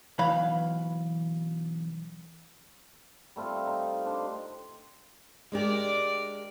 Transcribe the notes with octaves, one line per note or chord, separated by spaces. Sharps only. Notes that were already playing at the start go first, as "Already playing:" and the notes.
B1 E3 F#3 F5 B5
G3 A3 C4 F4
D#4
D4 C5
G#3 D4 G4 A#4 D5